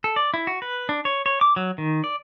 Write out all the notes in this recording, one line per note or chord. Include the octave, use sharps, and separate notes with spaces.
A4
D5
E4
F#4
B4
D4
C#5
C#5
D6
F#3
D#3
D5